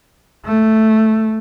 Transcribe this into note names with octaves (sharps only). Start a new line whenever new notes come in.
A3